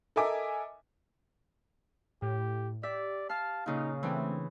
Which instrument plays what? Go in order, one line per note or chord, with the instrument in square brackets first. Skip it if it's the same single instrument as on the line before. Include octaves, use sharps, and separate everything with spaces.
[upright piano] A4 A#4 D#5 E5 G#5 D6
[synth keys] A2 [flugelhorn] G4
[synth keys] G4 [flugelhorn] D5 [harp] E5
[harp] F5 F6 [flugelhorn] A5
[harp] A#2 C#3 [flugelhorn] D#4
[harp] E3 [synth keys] A3 D4 G5 [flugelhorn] C4